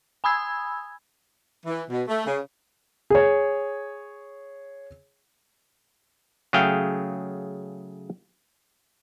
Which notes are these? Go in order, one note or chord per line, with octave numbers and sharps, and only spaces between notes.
G#5 B5 D#6 E6 G#6
E3
B2
A3
C#3
G#4 C#5
C#3 F#3 A3 G#4 F5 G5